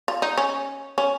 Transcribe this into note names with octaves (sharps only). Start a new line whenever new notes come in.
F4
D#4
C#4
C#4